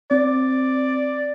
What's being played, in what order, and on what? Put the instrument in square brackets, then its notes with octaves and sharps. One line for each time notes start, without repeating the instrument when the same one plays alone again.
[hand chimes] C4 [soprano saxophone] D5